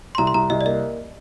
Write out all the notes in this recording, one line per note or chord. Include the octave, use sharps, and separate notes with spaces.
C6
C2 A#5
C6
C2 A#5
C2 D#5
D5
A#3 D#5